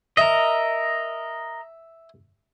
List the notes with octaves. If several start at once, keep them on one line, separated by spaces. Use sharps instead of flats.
A#4 D#5 E5